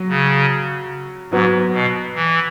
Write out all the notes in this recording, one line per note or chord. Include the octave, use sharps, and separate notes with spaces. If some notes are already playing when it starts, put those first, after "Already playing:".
Already playing: F#3 F#4
C#3
G#2 F#3 B3 F#4
B2
E3